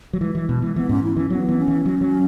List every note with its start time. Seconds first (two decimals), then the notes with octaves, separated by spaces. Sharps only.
0.13 F#3
0.21 E3 G#3
0.35 E3
0.49 B2
0.62 E3
0.76 E3 B3
0.89 G#2 C#4
1.04 E4
1.17 E3 C#4
1.30 F#3 B3
1.49 E3
1.58 C#4
1.68 E3
1.86 F#3
2.01 F#3